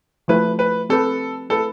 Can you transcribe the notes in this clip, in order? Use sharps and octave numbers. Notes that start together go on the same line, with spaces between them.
F3 A3 E4 G4 B4 C5
B4
C4 G4 A4 B4
A3 E4 A4 B4